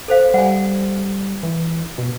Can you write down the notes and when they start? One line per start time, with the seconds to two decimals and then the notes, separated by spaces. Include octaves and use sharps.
0.08 A4 C5 F5
0.34 G3 F#5 G#5
1.43 E3
1.98 B2